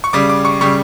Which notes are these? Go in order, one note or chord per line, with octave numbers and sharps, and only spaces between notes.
C#6
C#3 G3 D6
D6
C#6
C#3 G3 C#6